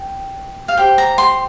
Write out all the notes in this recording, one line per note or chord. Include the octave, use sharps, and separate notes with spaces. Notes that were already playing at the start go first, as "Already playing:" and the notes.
Already playing: G5
F5
G4 C5 G5
A#5
C6